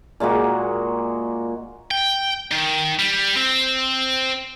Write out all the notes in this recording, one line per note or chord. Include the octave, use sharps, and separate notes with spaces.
A#2 G#3 A#3 F#4
G5
D#3
G3
C4